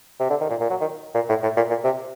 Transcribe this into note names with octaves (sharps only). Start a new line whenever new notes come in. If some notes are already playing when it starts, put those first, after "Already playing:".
C3
D3
D#3
A#2
A#2
F#3
D#3
A#2
A2
A2
A#2
A#2
C3